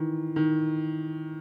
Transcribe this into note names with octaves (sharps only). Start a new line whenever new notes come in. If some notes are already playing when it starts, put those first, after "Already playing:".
Already playing: D#3 E3
D#3